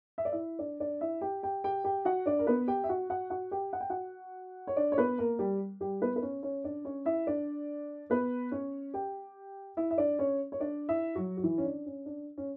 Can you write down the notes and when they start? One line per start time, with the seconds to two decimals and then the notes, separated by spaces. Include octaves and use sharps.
0.18 E5
0.25 D5
0.32 E4 E5
0.59 D4 D5
0.80 D4 D5
1.01 E4 E5
1.21 G4 G5
1.43 G4 G5
1.64 G4 G5
1.84 G4 G5
2.05 F#4 F#5
2.26 D4 D5
2.39 A#4
2.47 B3 B4
2.68 G4 G5
2.84 E5
2.89 F#4 F#5
3.10 F#4 F#5
3.30 F#4 F#5
3.51 G4 G5
3.73 F#5
3.80 G5
3.90 F#4 F#5
4.67 C#5
4.76 D4 D5
4.92 C#5
4.97 B3 B4
5.18 A#3 A#4
5.39 G3 G4
5.80 G3 G4
6.02 B3 B4
6.16 B4
6.22 C#4 C#5
6.43 C#4 C#5
6.64 D4 D5
6.85 C#4 C#5
7.05 E4 E5
7.27 D4 D5
8.10 B3 B4
8.52 C#4 C#5
8.94 G4 G5
9.77 E4 E5
9.91 E5
9.98 D4 D5
10.19 C#4 C#5
10.52 C#5
10.60 D4 D5
10.88 E4 E5
11.15 F#3 F#4
11.37 F#4
11.43 E3 E4
11.58 C#4
11.65 D4
11.86 C#4
12.06 D4
12.38 C#4